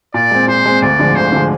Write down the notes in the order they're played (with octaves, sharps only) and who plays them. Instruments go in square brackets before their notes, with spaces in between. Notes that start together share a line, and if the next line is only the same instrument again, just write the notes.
[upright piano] A#2 [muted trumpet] D5
[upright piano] G#3 C4
[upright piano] A#2 [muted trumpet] C5
[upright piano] G#3 C4
[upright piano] D2 [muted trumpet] D5
[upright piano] D3 F3 G#3
[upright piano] D2 [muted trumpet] C5
[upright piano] D3 F3 G#3